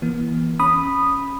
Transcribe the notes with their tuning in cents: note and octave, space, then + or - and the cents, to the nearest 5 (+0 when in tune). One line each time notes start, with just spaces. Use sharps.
E3 +0 A#3 +45
C#4 -5 B5 +0 D#6 -10